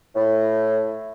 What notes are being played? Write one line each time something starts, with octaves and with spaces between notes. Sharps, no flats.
A2